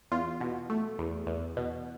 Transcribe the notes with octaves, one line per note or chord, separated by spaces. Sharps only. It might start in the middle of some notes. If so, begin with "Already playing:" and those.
E2 F4
B2
A3
E2
E2
B2